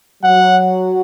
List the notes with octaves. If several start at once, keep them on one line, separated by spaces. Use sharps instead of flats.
F#3 F#5